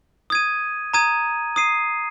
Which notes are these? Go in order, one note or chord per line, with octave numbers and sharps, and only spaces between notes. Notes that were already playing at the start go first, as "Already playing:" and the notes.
D#6 G#6 D#7
A#5 D#6 G#6 D#7
D#6 C7 D#7